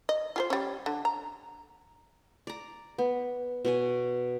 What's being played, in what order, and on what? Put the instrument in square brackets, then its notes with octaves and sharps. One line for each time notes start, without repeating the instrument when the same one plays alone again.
[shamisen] D#5
F4 G#4 C5
G3 C#4
D3
A#5
[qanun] D5 A#5
B3
B2 C#5 G#5